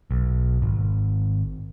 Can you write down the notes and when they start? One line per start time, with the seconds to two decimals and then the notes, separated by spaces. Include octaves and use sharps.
0.11 B1
0.62 G#1